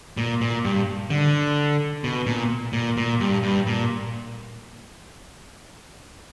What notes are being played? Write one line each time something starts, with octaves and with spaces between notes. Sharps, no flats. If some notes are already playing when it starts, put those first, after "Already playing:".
A#2
A#2
G2
D3
B2
A#2
A#2
A#2
G2
G2
A#2